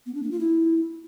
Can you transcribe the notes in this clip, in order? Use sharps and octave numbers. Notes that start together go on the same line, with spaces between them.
B3
D4
A#3
F4
E4